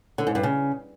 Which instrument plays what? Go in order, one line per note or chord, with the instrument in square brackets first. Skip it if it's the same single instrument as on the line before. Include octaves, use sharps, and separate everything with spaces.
[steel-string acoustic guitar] D3
G#2
G2
C#3